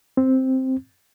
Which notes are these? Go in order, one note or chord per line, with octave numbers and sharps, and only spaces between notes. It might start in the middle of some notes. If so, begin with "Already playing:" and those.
C4